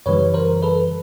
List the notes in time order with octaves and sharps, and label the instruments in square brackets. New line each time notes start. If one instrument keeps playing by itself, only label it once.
[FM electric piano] F#2 C#3 E3 G3 B4 C#5
A#4 C5
A4 B4